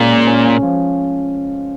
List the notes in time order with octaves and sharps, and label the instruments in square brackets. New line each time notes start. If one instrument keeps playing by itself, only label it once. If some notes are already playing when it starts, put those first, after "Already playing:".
Already playing: [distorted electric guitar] A#2 [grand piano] G#3 C#4
[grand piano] C#4
F3